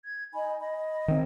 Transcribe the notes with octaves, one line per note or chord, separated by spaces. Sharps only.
G#6
D#4 D#5 G#5 B5
D#5 B5
D#3 C4 C#5 G5